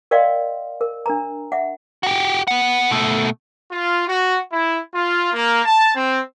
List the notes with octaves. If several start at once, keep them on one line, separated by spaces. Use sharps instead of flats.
A#4 D5 D#5 F5 G5 C6
A#4
D4 A#4 A#5
E5 F#5
F#4 G4
B3 F#5
B2 A3
F4
F#4
E4
F4
A#3
A5
C4